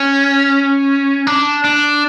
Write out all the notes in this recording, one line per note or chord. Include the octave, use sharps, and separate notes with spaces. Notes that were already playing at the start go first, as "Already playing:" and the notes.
Already playing: C#4
D4
D4